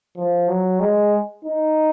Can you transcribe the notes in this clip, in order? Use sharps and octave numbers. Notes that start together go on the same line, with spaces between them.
F3
F#3
G#3
D#4